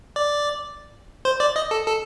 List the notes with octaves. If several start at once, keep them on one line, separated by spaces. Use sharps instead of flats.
D5
C5
D5
D#5
A4
A4